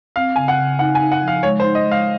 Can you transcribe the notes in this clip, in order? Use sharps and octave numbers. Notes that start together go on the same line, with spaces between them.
C4 F5
C#3 G#5
F#5
C#3
D#4 F#5
G#5
D#4
F#5
F3 F5
G#3 C#5
C5
D#4
D#5
G#3
F5